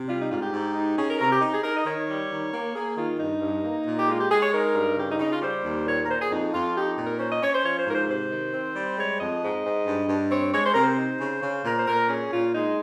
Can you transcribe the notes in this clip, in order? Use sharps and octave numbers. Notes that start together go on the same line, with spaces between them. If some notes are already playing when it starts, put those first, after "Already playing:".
Already playing: C3
G3 F4
D#4
G#2 F4
G4
G#2
D#4
C#4 G#4
A#4
C3 A#4
G4
D#4
G#4
D#4 A#4
D#5
D#3 C#5
G3
D#3
A#3
A#3 G#4
D#3 F4
G2 D#4
G2
A#3
A#2
G4
G#3 F4
G4
G#3 G#4
C#5
D#4 A#4
G2
C#3 G4
D#4
C#3 D#4
F4
G3 C5
D#2
A#2 C#5
A#4
A#2 C5
G#4
F2 D#4
F2 F4
D#4 G4
A#2
A#4
C#4 C5
D#5
C#4 C#5
C5
F3 C#5
C5
G#2 A#4
C5
C3 C5
D#3
C4
G3
G#3 C#5
F2 D#5
G#2
G#2
G2
G2
C4 C#5
G#3 C#5
C5
C3 A#4
C5
D#4
C#3
C#3
A#2 A#4
C5
A#2 A#4
C#4 G#4
A#2 F4
G#3 D#4